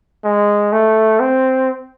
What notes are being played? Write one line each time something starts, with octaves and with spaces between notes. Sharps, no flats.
G#3
A3
C4